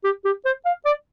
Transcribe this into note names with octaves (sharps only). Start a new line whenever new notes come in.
G4
G4
C5
F5
D5